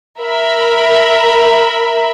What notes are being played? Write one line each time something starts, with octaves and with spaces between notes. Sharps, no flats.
A#4 E5 B5